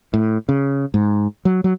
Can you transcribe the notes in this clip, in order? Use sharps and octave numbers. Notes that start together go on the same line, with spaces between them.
A2
C#3
G#2
F#3
F#3